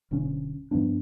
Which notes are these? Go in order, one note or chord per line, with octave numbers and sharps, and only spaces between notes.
D1 D2 B2 C#4
G2 F3 B3 D4